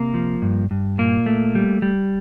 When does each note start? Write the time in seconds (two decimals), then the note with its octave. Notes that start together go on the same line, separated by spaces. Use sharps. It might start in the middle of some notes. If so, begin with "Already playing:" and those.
Already playing: C3 A#3
0.14 F3
0.42 G2
0.71 G2
0.98 A#2 A#3
1.26 A3
1.55 G3
1.82 G3